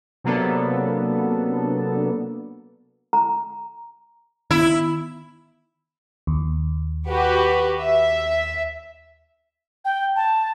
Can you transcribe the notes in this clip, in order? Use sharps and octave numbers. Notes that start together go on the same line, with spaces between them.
C3 F#3 A#3 B3 D4 A4
A#5
D#3 B3 E4
D#2
F#4 G4 B4
E5
G5
A5